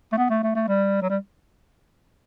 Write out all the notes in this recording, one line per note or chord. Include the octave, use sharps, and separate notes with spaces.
A3
B3
A3
A3
A3
G3
F#3
G3